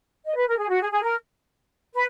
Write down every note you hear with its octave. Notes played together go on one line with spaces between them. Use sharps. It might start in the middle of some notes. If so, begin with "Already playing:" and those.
D#5
B4
A#4
G#4
F#4
G#4
G#4
A#4
B4